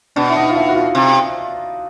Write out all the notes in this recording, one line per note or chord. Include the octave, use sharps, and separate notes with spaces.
B2 D4
E4
D#4
F4
E4
F#4
F4
C3